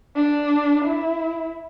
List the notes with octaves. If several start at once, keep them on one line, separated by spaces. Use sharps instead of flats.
D4
E4